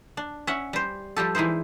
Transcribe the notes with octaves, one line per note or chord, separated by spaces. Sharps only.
D4
C#4 E5 F#5
G3 C5
F3 G3 G4 A4
E3 G#3 D#4 E4 C5